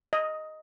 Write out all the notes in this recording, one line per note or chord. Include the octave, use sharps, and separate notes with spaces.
D#5